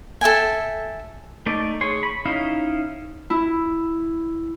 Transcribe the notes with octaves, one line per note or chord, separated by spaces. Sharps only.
A4 E5 G5 G#5
A3 D#4 D5
G#4 C#5 C6
B5
C#4 D#4 E4 D#5 F5
E4